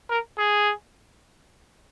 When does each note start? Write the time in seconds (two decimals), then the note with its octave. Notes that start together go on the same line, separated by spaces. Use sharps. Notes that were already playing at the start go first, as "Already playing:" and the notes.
0.10 A#4
0.38 G#4